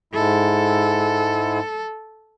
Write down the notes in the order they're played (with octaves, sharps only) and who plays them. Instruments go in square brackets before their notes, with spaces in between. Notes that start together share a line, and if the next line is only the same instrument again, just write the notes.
[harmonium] G#2 G#3 E4 [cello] A4